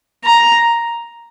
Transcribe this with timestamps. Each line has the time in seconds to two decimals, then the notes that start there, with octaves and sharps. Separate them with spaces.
0.25 A#5